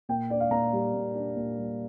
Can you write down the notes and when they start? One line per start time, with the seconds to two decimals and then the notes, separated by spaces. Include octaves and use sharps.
0.09 A#2 G5
0.30 D4 D5
0.40 F5
0.51 A#2 A#5
0.73 G3
0.94 A#2
1.15 D4
1.36 A#2
1.58 G3